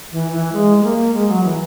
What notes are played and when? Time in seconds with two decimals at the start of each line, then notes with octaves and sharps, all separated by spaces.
0.12 E3
0.32 E3
0.52 G#3
0.78 G#3
0.83 A#3
1.14 G#3
1.29 F#3
1.44 E3